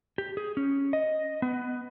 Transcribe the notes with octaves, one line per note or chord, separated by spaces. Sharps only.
G4
G#4
C#4
D#5
B3